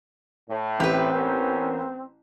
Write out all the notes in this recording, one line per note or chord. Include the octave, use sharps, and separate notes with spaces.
A2
A1 C4 G4 B4
B3 C#4 A#4